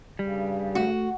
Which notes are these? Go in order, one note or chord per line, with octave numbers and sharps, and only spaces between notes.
G2 C#3 G3
A3 F#4